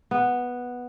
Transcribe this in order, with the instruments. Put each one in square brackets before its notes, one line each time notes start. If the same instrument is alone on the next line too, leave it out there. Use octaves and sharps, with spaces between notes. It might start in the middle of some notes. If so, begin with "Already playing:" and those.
[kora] B3